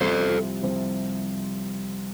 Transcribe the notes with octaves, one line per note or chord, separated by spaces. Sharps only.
C2 C3 F3 C4 F4 A4 C5
C2 C3 F3 C4 F4